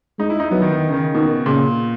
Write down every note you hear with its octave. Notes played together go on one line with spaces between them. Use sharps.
G#3 D#4
E4
D#4
F#3 B3
D#3
D#3
C#3
D#3
B2 D#3
A#2 C#3